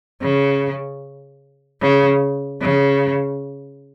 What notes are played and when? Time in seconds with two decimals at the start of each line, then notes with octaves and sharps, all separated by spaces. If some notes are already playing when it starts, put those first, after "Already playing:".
0.22 C#3
1.81 C#3
2.62 C#3